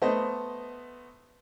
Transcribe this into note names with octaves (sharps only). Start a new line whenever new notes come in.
A3 B3 C5 D#5